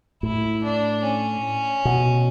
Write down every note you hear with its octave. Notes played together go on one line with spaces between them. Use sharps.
A2 E4
D4
C#4
B2